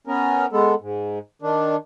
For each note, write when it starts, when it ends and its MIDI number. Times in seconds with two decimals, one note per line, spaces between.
0.07 0.46 59
0.07 0.46 61
0.07 0.46 70
0.53 0.74 56
0.53 0.74 59
0.53 0.74 69
0.81 1.19 44
1.42 1.76 51
1.42 1.76 62